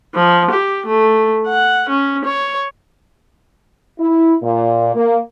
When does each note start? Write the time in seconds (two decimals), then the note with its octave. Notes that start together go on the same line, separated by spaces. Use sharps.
0.15 F3
0.51 G4
0.86 A3
1.48 F#5
1.89 C#4
2.25 C#5
3.99 E4
4.42 A#2
4.94 A#3